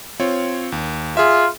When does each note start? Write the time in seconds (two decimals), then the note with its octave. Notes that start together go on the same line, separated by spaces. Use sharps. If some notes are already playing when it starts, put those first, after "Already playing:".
0.20 C4 F4 C#5
0.72 D#2
1.17 F4 G#4 E5